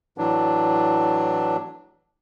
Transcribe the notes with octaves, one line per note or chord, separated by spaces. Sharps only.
A2 E3 F#3 D4